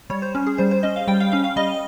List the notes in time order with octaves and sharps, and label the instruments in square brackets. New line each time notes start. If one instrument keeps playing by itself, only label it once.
[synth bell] G3 C#5
C5
C#4
G#4
G3 C5
C5
C#4 D#5
F5
G3 G5
F5
C#4 F5
F5
G3 D#5